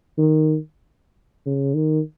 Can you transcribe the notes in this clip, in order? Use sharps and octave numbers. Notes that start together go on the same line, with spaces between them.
D#3
C#3
D#3